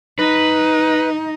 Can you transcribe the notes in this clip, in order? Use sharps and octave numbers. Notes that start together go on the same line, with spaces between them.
D#4 B4